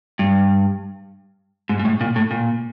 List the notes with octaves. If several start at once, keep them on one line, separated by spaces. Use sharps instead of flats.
G2
G#2
G#2
A2
A#2
A2
A#2